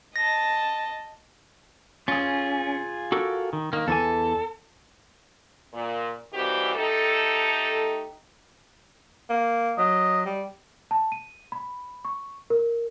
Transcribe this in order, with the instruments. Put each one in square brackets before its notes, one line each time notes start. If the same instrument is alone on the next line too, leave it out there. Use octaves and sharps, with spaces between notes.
[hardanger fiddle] D#5 A5 [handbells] A#6
[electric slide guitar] C#4 [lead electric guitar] F4 G#4
[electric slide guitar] F#4 A4 A#4
D#3
[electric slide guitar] D#3 [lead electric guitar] A#3
[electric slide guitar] E2 E3 G#5 [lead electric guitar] A4
[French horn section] A#2
D#3 E3 G3 C4 F#4 G4
A3 D#4 G4 A4
[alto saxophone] A#3
[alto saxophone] F#3 [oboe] D#5
[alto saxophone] G3
[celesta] A5
D#7
B5
C#6
A#4